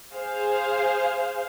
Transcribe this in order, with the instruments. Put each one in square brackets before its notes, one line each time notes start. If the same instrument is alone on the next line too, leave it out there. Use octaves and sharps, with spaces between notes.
[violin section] G#4 C5 F5